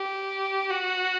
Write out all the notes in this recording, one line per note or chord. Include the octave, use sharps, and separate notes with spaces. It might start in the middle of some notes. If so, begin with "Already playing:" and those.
Already playing: G4
F#4